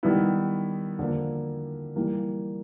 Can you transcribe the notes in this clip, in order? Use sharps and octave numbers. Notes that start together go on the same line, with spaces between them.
D#3 G3 B3 E4
D3 F3 A#3
E3 G3 A#3